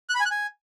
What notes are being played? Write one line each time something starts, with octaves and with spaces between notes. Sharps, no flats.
F#6
B5
G#5
F#6
G#5